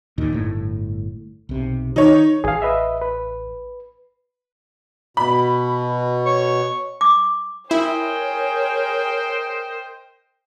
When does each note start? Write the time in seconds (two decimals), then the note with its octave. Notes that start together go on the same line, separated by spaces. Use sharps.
0.18 D#2 A#2 D#3
0.32 G1 A2
1.49 B1 C3
1.96 D#3 D#4 C#5
2.44 A1 G#4 F5
2.62 B4 D#5 E5
3.02 B4
5.17 B2 B5
6.26 C#5 C#6
7.01 D6
7.71 E4 G#4 A#4 C5 C#5 D#5 G5